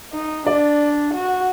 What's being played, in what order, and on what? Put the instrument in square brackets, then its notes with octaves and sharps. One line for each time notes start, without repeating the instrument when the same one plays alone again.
[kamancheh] D#4
[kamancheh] D4 [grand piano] D5
[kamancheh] F#4